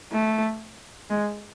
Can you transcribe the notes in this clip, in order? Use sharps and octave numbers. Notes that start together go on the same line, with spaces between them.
A3
G#3